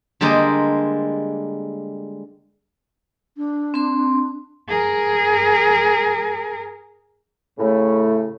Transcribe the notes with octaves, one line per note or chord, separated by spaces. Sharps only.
D3 G3 G#3 A#3 C5 D#5
D4
C4 C6
G#4 A#4
A2 C#3 A3